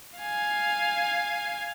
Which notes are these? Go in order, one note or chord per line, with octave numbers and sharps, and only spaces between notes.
F5 G#5